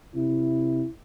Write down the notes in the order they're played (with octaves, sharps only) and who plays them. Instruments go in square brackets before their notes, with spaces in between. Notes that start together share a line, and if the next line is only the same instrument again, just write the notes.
[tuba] C3 [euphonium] E4